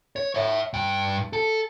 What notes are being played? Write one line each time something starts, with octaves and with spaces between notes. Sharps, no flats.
C#5
C#5 E5
G2 G5
A4